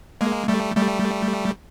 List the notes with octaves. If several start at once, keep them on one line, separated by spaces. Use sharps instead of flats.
G#3 A#3
G3 A3
G3 A3